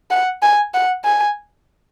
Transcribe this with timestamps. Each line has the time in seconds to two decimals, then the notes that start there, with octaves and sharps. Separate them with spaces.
0.11 F#5
0.43 G#5
0.74 F#5
1.04 G#5